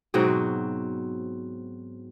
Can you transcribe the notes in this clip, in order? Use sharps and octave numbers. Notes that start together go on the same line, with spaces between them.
G#2 B2 F#3 C4